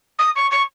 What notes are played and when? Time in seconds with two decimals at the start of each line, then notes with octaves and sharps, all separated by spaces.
0.18 D#6
0.35 C#6
0.51 C#6